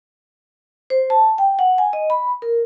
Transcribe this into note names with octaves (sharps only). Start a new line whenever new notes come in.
C5
A5
G5
F#5
G#5
D#5
B5
A#4